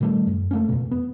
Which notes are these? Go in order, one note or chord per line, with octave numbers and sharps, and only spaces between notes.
A#2 D#3 G3 A3
F#2
A3 A#3 C#4
F2 B2
B3